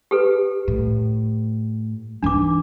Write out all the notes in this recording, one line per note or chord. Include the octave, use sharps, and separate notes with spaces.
G4 A4 B4
A2
G#2 E3 D4 D6